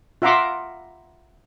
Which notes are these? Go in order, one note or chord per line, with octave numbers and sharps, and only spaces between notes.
F4 E5 F#5 A#5 C6 D6